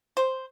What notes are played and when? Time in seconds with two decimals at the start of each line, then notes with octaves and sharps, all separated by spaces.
0.17 C5